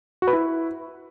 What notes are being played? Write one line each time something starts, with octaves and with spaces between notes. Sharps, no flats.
F#4
B4
E4